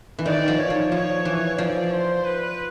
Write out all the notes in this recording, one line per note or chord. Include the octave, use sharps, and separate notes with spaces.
E3
D#3 D5
F3
C#5
F3
F3 C#5
E3
F3 D5
C5
B4